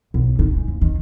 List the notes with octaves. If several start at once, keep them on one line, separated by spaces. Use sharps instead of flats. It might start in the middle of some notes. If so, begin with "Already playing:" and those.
B1
D#4
G#3
D#2
D#3